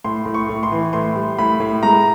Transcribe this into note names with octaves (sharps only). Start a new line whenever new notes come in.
A2 C6
A2
C#6
A2
C6
E3
A2 C6
G3
A2 B5
A2
G#3 A#5